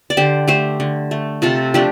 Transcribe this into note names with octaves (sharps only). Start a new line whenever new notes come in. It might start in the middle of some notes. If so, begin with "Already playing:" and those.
D5
D3 G4 C5
A3 G4 C5
D3
A3
C3 F4 A4
F3 A3 D4 G4